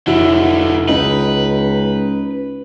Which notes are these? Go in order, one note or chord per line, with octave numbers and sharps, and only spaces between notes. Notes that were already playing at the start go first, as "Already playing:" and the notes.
F1 D3 F#3 E4 F#4
C#2 D#4 B4